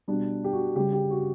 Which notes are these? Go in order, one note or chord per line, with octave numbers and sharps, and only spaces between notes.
B2 G3 D4
G4
F#4
C#3 G3 G4
G4
F#4